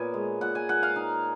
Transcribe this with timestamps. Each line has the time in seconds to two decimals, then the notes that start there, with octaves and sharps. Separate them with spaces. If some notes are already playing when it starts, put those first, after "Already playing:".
Already playing: A#2 B3 C#5 G#5
0.14 G#3
0.41 A#2 F#5
0.55 G#5
0.69 A#2 F#5
0.83 F5
0.96 D#4